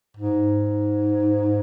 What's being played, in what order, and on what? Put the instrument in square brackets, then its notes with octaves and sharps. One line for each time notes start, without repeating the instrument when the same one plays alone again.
[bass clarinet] G#2